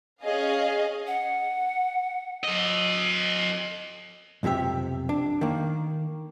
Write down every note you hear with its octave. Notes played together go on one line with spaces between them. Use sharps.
C#4 G#4 D#5 F5
F#5
A4 D#5
B1 F2 C3 G4 E5
D4
D#3 A#3